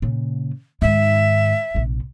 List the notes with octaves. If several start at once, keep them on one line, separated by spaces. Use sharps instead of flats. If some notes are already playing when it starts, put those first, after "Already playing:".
A#2 C#3
G#2 D#3 E5
A#1 C3